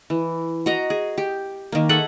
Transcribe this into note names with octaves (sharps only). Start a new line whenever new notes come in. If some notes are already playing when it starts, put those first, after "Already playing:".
E3
F#4 D#5 A#5
G#4
G4
D#3 A#3
G#4 A4 E5 F#5